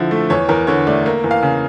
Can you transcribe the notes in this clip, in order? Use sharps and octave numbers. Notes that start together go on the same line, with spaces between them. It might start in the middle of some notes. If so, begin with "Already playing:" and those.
Already playing: D3 F3 E4
A3
E2 C#5
E2 A#4
D3 C#5
A3 D5
A#3
E2
F5
C#3